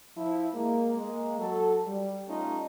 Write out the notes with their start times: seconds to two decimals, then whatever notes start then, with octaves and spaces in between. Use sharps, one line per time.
0.17 F3 E4
0.54 G#3 A#3
0.97 G#3 A#3
1.40 F#3 A4
1.86 G3
2.28 G3 A3 C#4 D#4 F4 A4